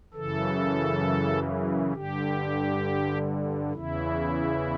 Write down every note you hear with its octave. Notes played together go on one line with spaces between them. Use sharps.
F#2 C#3 E3 A4
G2 D3 G4
E2 C#3 E3 E4